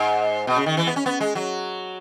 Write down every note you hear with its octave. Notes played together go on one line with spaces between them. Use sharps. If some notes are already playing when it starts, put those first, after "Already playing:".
Already playing: G#2
B2
C#3
D#3
E3
B3
C#4
B3
G#3
F#3